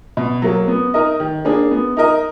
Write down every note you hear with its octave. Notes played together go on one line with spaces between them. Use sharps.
B2
F#3 A#3
B3
D#4 A#4 D#5
D#3
A#3 D4 G#4
B3
D#4 A#4 D#5